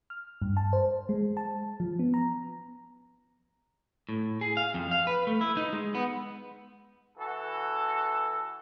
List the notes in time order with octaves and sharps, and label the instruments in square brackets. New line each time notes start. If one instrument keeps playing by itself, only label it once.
[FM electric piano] F6
G2
A5
C5
G#3
A5
F3
B3
A#5
[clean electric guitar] A2
G#4
F5
F2
F5
B4
A3
E4
D#4
G#3
B3
[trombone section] E3 F#4 A4